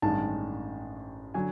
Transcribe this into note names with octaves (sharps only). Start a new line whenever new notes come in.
A1 G2 D#3 G#3 A5
D3 F#3 G#5